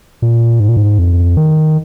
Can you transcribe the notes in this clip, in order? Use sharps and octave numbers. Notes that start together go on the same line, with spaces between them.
A#2
G#2
A#2
G#2
F2
D#3